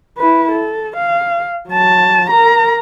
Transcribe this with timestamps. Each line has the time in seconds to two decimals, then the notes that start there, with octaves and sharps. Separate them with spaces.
0.18 E4 B4
0.52 A4
0.97 F5
1.69 F#3 A5
2.30 A#4 A#5